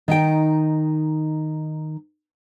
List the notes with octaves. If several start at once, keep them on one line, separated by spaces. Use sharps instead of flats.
D#3 D#4 G5